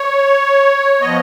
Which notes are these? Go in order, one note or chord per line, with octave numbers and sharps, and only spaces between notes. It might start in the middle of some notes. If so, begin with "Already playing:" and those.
Already playing: C#5
F3 B3 D#5